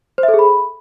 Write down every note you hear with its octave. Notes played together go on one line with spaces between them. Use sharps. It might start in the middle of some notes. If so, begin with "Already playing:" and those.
C5
E5
A4
G#4
B5